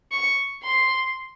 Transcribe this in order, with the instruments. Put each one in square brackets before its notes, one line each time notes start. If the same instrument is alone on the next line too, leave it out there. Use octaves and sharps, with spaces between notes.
[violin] C#6
C6